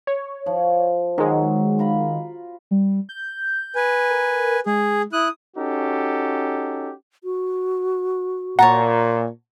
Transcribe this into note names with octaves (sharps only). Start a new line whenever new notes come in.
C#5
F3
D#3 F#3 G#3
F4 A#5 B5
G3
G6
B4 G#5
A#4
G#3 G#4
E4 D#6 F#6
C#4 D#4 F#4 G4 A4
F#4
A#2 C#5 F#5 A5 A#5